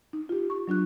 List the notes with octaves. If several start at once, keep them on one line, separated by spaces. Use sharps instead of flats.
D#4
F4 G4
C#6
F#3 D4 F4 F#6